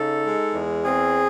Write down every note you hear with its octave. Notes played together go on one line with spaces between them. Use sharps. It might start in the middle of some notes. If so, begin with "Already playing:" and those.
Already playing: C#3 D#4 A4
G#3
E2
C4 G#4